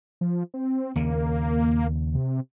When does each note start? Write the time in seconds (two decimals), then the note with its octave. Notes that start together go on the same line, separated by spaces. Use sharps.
0.21 F3
0.54 C4
0.96 D#2 C#3 A#3
2.14 C3